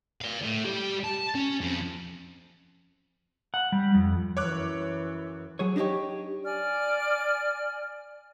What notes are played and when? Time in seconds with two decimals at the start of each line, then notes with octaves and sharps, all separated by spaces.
0.21 D5 F5
0.41 A2
0.64 G3 G4
1.04 A5
1.35 C#4
1.61 F2
3.54 F#5
3.72 G3
3.95 F2
4.37 F#2 E3 C#5 D6 F#6
5.59 F#3 G#4 C#5
5.76 D4 D#4 F#4 G4 C#5
6.44 D5 G#5 F6